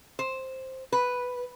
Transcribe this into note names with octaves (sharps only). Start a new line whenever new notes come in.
C5
B4